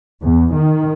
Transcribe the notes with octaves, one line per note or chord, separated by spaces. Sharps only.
E2
D#3